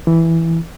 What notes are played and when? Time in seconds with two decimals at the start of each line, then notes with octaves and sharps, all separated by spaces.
0.07 E3